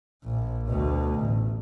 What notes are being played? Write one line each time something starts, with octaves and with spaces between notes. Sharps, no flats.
A#1
D2 B2
A1